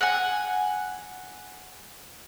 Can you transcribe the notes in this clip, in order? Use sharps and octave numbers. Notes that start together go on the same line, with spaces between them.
F#5 G#5